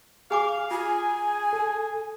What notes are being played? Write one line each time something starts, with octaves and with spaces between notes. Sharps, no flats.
G#4 F5 G#5 D6
F4 G#4 G#5
A4